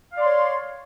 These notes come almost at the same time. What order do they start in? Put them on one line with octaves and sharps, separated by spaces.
F5 D5 C6 C#5